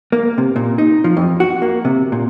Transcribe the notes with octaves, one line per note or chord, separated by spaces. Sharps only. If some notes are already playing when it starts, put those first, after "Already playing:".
A#3
C3
A#2
D#4
F3
F2
F#4
A#3
C3
A#2